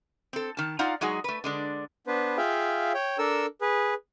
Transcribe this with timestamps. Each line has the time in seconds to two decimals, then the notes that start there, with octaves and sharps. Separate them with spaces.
0.33 C4 A4
0.57 D#3 A5
0.79 D#4 F4 D5 F5 F#5 A#5
1.01 F#3 G#3 D#4 F#4 G#4
1.24 A3 B4
1.44 D3 G#3 D4
2.07 B3 D4 B4 C5
2.37 F4 G#4 E5 F5 G5
2.94 C#5 G5
3.18 D4 A4 A#4 E6
3.61 G#4 B4